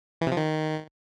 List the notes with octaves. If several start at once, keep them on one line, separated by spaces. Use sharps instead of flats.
E3
C3
F3
D#3